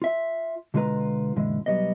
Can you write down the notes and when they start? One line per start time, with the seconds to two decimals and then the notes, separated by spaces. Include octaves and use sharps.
0.02 F4 E5
0.74 B2 D3 G#3 F4 B4 A#5
1.36 F#2 A#2 D3 E3 G#3
1.66 B1 F#3 G3 B3 D#5